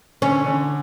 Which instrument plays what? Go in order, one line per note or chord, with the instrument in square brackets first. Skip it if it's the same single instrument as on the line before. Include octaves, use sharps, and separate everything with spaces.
[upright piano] D3 [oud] C#4
[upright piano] D3